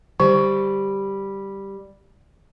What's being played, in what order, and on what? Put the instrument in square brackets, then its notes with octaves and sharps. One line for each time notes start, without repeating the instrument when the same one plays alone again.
[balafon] D3 [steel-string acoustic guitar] G3